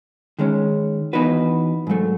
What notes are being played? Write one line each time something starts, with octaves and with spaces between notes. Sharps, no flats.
D#3 G#3 C#4
E3 B3 D#4 F#4 B4
G#2 F#3 A3